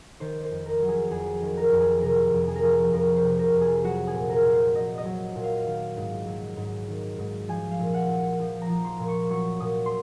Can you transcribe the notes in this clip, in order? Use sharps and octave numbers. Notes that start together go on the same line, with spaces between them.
D#3 C5
C5
F2
A#4
F#3
G#4
F2 G#4
D#3
A#4
F2
G#4
C3 A#4
F2
G#4
A#4
F3 G#4
F2 A#4
C5
C3
A#4
F2
G#4
F#3 F#4
G#4
A#2
A#4
A#2
C5
F#3 D#5
D#5
F#3
A#2
F5
D#3
G#2
F#3
G#2
D#3
G#2
F3 G#5
F5
A#2
F#5
A#2
F3
A#5
F3
C6
A#2
C#6
F#3 C#6
A#2 D#6
C6